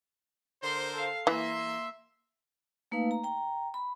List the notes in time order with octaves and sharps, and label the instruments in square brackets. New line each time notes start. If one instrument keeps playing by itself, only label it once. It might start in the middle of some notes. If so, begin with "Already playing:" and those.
[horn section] D3 A#4 C5 [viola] C6
[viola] A4 F5
[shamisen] E3 [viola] A#3 [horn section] E5 C6
[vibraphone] A3 A#3 D#4 B4 F5
A#5
G5 A#5
B5